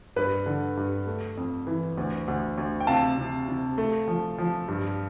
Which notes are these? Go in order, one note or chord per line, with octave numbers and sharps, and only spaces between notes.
G2 B4
D3
G2
A3
F2
E3
D2
D2
D2
G5
C3 F5 A5
C3
C3
A3
F3
F3
G2